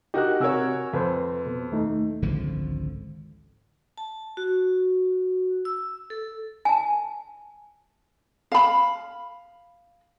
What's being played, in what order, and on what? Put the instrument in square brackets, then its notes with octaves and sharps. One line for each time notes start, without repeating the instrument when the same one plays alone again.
[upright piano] D#4 F#4 A#4 [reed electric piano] G4 F#6
[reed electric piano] C3 G#5 E6 [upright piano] F#4 A#4 C#5
[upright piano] F2 [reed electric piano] A4 B4 C5
[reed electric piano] B2
D#2 A3 D#4
[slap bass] G#1 C#2 D3 F3
[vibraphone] A5
F#4
E6
A4
[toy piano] G#5 A5
[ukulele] F5 B5